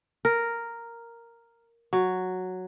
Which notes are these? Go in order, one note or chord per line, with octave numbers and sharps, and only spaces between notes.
A#4
F#3